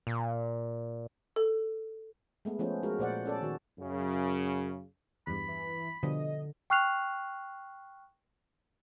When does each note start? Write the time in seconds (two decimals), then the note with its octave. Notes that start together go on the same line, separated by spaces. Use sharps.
0.07 A#2
1.36 A4
2.45 G#3 A3 B3
2.59 F3 A3 B3 C#4 F4 C5
2.83 G#3 F4 F#4 A#4
2.99 A#2 C5 D5 F#5
3.26 C#4 A4 D5
3.42 D#3 F#4
3.78 F#2 C#3
5.27 E2 G2 B5
5.48 E3
6.03 B2 D3 F3 G3 D#5
6.70 G5 C#6 F6 F#6 C7 F7